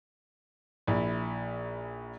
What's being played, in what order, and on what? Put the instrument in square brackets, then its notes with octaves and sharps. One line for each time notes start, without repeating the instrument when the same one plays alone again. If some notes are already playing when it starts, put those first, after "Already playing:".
[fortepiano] A#1 E4